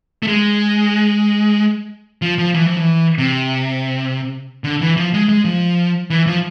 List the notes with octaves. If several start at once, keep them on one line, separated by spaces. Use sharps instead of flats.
A3
G#3
F3
F3
E3
F3
E3
C3
D3
E3
F3
G#3
G#3
F3
E3
F3